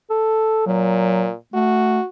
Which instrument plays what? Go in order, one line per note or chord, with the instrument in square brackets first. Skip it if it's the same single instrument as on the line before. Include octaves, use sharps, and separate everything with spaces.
[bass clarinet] A4
[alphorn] A#2 [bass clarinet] F#3
[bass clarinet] A3 [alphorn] F#4